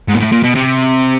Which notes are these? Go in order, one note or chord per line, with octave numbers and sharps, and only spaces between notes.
G#2
A#2
A2
A#2
B2
C3